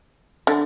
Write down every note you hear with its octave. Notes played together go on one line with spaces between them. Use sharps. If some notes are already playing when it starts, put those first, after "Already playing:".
D3